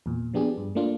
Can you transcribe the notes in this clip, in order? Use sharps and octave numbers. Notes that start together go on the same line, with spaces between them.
E2 A#2
F3 B3 D4 G4 G#4
G2
A3 A#3 D4 F4